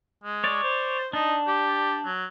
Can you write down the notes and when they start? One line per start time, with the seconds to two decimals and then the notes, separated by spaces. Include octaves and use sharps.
0.24 G#3
0.44 C#5 D5
0.63 C5
1.13 D4 D#4
1.47 G4
2.06 F#3